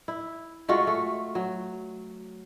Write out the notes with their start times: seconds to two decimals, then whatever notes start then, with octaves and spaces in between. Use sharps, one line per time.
0.08 E4
0.68 G#3 A3 F4 F#4
0.87 A3
1.35 F#3